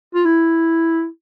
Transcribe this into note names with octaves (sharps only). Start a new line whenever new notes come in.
F4
E4